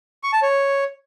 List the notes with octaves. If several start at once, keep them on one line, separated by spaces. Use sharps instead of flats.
C#6
A5
C#5